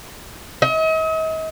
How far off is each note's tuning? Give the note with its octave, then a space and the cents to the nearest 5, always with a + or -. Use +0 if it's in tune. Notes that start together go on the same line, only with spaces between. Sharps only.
D#5 +40